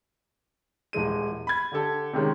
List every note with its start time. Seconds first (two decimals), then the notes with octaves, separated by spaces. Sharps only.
0.93 D#1 E3 G#3 D#7
1.47 B5 G#6
1.72 D3 G4 A4
2.13 C3 D#3 G#3 C#4